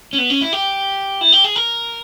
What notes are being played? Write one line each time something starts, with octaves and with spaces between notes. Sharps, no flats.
C#4
B3
C#4
E4
G4
E4
G4
G#4
A#4